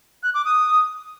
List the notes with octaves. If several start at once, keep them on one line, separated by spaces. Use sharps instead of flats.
F#6
D6
D#6